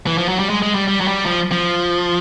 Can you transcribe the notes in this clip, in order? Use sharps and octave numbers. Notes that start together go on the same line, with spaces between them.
E3
F3
F#3
G3
G#3
G#3
G3
G3
F#3
G3
F3
F3